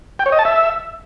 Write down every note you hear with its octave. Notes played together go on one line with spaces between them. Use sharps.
G5
C#5
D#5
A5
E5